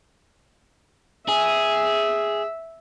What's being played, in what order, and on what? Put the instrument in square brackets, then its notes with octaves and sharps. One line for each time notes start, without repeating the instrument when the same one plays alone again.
[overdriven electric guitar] G#4 [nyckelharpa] E5